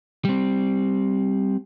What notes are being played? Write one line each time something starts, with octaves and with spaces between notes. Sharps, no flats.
G3 C4